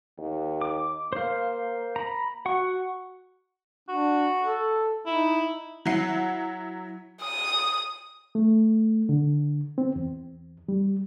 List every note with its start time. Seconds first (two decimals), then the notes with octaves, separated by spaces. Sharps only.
0.18 D#2
0.61 D6
1.13 A#3 C5 F5
1.96 A#5 B5
2.46 F#4 F#5 C#6
3.89 D4 F#4
4.42 A4
5.06 D#4 E4
5.85 F#3 E4 F#5 C7
7.22 D#6
8.35 A3
9.09 D3
9.78 C4
9.96 E2
10.69 G3